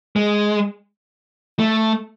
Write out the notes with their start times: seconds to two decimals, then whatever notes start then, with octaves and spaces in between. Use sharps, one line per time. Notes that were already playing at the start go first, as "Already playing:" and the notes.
0.16 G#3
1.59 A3